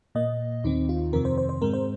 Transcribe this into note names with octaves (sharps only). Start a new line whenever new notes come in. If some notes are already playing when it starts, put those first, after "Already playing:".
A#2 A#3 D#5
D#2 D#3 C4 D#4
F4
F2 C3 D#3 C4 A#4
C5
C5
C5
G#2 G#3 C4 A#4
C5